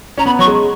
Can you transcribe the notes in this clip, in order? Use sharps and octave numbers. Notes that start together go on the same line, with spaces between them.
C#4 A#5
B3 B5
F#3 C#6
G#3